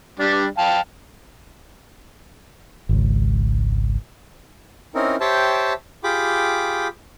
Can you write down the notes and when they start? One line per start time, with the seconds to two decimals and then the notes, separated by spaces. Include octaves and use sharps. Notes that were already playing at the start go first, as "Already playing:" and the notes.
0.19 G3 D4
0.58 F5 G5 A5
2.89 G#1 C#2
4.95 C4 C#4 D#4 E4 A#4
5.21 G4 C5 C#5 E5 G5 A5
6.04 F4 G4 G#4 G5 B5 D6